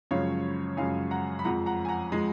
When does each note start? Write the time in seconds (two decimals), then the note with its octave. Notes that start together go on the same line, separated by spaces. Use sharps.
0.11 F#2 C#3 F3 G#3 C#5 F5
0.77 F#2 C#3 F3 G#3 F5 G#5
1.11 F#5 A#5
1.39 B5
1.44 F2 F3 G#3 F#5 A#5
1.66 F#5 A#5
1.85 G#5
1.89 F#5 A#5
2.12 F3 G#3